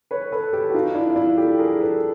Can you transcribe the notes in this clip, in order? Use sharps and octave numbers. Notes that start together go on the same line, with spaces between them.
B4 C#5
A4 B4
G4 A4
F#4
D#4 F4
D4 E4
F4
D4 E4
G4 A4
G#4 A#4
A4 B4